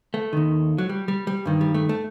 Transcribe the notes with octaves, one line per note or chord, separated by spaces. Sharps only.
A3
D#2 D#3
F#3
G3
G3
G3
G2 D#3
G3
A3
A3